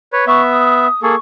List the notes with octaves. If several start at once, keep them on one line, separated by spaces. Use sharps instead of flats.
B4 C#5
B3 E5 C#6
D#6
A#3 G#4 A4 C#6